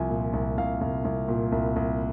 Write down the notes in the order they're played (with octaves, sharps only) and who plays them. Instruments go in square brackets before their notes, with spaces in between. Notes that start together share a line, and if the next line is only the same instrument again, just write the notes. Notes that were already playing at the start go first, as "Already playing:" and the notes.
Already playing: [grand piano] C2 F3 G#5
A#2
C2
C2 F5
C2
C2
A#2
C2
C2